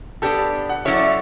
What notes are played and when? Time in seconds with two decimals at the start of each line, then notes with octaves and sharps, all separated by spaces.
0.22 B3 D4 G4 A4
0.69 F#5
0.85 F#3 C#4 E4 A4 C#5 E5
0.94 D5
1.03 E5